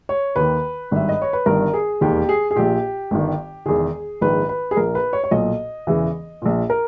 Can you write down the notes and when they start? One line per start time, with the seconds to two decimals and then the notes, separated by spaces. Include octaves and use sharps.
0.09 C#5
0.36 D#2 D#3 B4
0.91 G#1 G2 D#3 E5
1.09 D#5
1.22 C#5
1.33 B4
1.46 G1 G2 D#3 A#4
1.74 G#4
2.01 E1 D#2 D#3 G4
2.29 G#4
2.51 G#4
2.56 A#1 A#2 G4
3.11 G1 G2 D#3
3.66 E1 E2 D#3 G#4
4.21 A#1 G#2 D#3 B4
4.49 B4
4.71 G#4
4.77 A#1 A#2 A#4
4.95 B4
5.13 C#5
5.24 C#5
5.31 B1 A#2 D#5
5.87 E1 E2 C#3 E3
6.42 A#1 A#2
6.70 A#4